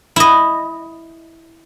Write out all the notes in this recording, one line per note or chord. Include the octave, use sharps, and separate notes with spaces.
E4 D#5